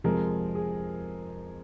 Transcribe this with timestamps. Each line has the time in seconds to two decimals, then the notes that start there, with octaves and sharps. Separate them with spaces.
0.04 F2 C3 F3 G#3 A#4
0.55 G#4